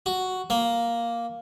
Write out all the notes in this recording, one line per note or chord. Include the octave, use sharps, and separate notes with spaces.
F#4
A#3